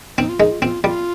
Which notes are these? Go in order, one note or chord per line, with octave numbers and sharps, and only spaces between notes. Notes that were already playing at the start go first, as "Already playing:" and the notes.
C4 D#4
F4
G#3 D#4
F4
C4 F4
G3 F4